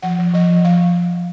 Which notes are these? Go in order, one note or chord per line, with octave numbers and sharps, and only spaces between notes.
F3 F#5
F3
F3 D#5
F3
F3 F5